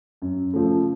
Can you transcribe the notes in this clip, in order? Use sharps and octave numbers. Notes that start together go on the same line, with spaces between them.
F#2
C#3 F3 A3